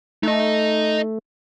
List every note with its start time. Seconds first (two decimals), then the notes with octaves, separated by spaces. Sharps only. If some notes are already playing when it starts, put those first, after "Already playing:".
0.23 A3 D#4 D#5